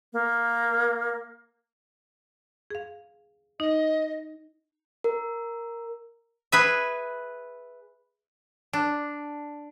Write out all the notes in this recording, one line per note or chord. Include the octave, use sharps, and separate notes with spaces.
A#3
G#4 F5
D#4 D#5
A#4
G#4 B4 E5
D4